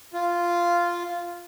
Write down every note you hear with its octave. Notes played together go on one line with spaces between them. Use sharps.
F4